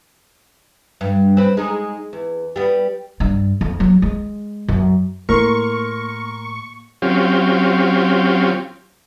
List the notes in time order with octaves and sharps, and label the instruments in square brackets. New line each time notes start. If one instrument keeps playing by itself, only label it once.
[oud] G2
C4 B4
G#3 D#4
E2
G3 B3
[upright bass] G2
F2
F#3
G#3
F#2
[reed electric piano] A2 C6 [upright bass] A#3 [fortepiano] A#4 [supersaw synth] C#6
[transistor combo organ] F#3 C4 C#4 F4 G4